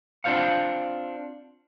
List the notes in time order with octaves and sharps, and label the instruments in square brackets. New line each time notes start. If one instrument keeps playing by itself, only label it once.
[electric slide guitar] C4 D4 F4 C5 F5 F#5